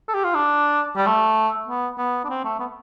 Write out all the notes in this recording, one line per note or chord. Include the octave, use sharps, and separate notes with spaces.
A4
G4
F4
D4
G3
A3
B3
B3
D4
C4
A3
B3